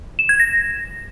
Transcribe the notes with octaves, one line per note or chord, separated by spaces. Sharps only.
E7
G#6
A#6